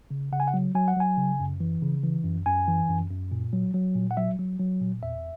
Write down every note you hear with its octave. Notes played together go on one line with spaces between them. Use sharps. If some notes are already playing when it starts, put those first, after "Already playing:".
C#3
C#3 F#5
G#5
F#5
F#3
F#3 G#5
F#5
F#3 G#5
C#3
F#2
E3
C#3
E3
F#2
F#2 G#5
E3
F#2
F#2
A#2
F#3
F#3
A#2
F#5
F#3 E5
F#3
F#3
A#2
E2 E5